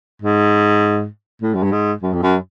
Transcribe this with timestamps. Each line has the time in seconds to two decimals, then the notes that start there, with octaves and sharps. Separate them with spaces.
0.22 G#2
1.42 A2
1.54 F#2
1.63 G2
1.72 G#2
2.02 F#2
2.13 F2
2.23 F#2